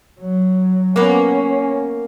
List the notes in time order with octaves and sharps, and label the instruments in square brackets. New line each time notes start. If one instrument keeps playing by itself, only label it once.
[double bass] F#3
[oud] A#3 B3 [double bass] C#4